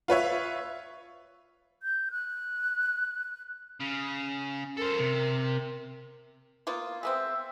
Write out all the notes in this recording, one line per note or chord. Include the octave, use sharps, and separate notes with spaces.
F4 B4 C#5 E5
G6
F#6
C#3
A4 A#4 C5
C3
A#3 B3 F4
G#3 B3 C4 E5